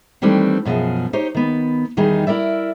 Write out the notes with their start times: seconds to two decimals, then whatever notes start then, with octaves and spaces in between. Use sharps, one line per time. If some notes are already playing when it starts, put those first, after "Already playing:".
0.22 D#3 E3 G3 A3 C4 D4
0.65 F#2 B2 D3 F3 G#4
1.13 D#4 G4 C5 C#5
1.34 D#3 B3
1.97 E2 D#3 G3 D#4 G#4
2.27 E4 A#4 D5 E5